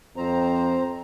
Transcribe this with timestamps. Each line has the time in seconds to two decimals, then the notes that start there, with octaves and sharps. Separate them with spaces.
0.17 F2 C4 C5 A#5